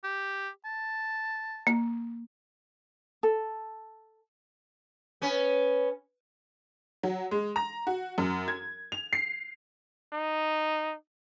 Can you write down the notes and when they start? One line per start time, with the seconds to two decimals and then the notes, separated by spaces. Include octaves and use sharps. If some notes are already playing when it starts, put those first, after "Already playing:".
0.04 G4
0.65 A5
1.67 A#3
3.23 A4
5.22 B3 C#4
7.03 F#3
7.31 G#3
7.56 A#5
7.87 F#4
8.18 F#2
8.48 G#6
8.92 F7
9.13 C7
10.13 D#4